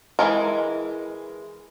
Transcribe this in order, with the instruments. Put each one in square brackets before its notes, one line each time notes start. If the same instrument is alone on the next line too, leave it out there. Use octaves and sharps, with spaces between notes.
[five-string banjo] E3 F#3 G#3 A#4